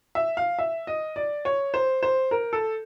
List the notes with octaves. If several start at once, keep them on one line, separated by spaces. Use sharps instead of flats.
E5
F5
E5
D#5
D5
C#5
C5
C5
A#4
A4